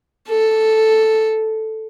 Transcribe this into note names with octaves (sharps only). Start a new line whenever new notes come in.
A4